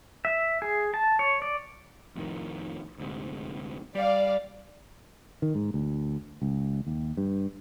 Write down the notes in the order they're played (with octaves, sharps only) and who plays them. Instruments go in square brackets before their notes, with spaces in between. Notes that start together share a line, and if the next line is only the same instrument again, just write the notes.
[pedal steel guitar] E5
G#4
A5
C#5
D5
[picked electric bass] F2 A2 D#3
D2 G#2 C3
[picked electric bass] G3 [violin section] D5 F5
[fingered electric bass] D#3
G#2
D2
C#2
D#2
G2